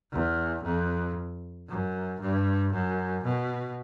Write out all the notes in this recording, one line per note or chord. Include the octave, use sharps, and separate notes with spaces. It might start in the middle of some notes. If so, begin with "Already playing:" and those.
E2
F2
F#2
G2
F#2
B2